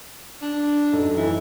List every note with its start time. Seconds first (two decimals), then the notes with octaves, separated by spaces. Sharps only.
0.42 D4
0.93 F#2 D#4 A4
1.17 E3